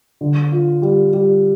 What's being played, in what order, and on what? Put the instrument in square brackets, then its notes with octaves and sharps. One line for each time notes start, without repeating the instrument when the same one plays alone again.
[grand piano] D3
F4
G3
G3